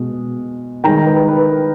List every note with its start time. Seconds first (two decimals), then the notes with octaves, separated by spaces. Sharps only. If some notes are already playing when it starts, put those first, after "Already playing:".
Already playing: B2 G#3
0.84 D#3 G#3 G5 A#5
1.06 B4
1.28 B4
1.50 A#4